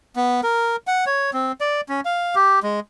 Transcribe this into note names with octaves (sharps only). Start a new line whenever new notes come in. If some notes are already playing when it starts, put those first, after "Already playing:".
B3
A#4
F#5
C#5
C4
D5
C#4
F5
G4
G#3